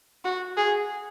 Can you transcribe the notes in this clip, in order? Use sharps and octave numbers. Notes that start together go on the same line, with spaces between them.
F#4
G#4